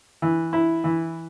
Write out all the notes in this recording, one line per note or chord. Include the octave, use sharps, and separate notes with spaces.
E3
E4
E3